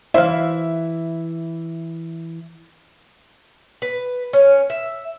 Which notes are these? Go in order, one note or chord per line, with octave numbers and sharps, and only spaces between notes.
E3 E4 C5 E5 F5
B4
C#4
E5